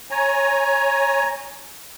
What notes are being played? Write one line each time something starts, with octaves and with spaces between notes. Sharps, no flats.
C#5 G#5 A#5